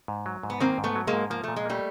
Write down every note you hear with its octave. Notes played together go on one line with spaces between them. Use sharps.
G#2
F#3
G#2
B3
D#3 A#3 C4
G#2
A3 B3
F#3
G#3 A#3
G#2
F3 A#3
A#2 A3
G#3
G3 A3 A#3